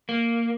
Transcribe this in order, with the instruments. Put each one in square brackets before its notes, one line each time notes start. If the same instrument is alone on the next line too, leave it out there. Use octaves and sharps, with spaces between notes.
[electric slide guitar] A#3